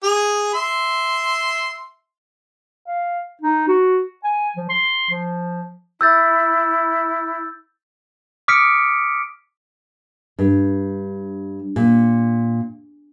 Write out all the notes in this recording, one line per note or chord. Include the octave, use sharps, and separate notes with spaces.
G#4
E5 C6
F5
D#4
F#4
G#5
F3
C6
F3
E4 E6 G6 A6
D6 D#6 F6 B6 C#7 D7
G2
A#2